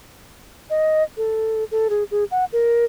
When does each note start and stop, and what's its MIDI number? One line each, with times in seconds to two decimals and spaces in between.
0.70 1.03 75
1.17 1.64 69
1.71 1.88 69
1.90 2.03 68
2.11 2.24 68
2.31 2.45 78
2.53 2.85 70